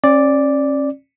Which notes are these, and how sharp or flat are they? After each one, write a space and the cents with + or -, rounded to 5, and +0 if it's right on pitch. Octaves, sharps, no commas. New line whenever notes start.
C#4 -35 D5 +0